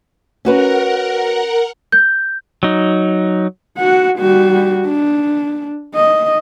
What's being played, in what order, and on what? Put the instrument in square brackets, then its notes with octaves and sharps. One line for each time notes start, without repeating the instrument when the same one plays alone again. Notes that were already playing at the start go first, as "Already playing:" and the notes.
[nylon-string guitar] C#4 F#4 B4 [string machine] A#4 F#5
[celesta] G6
[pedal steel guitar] F#3 D#4
[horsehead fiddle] F#4 F#5
G3 F#4
D4
D#5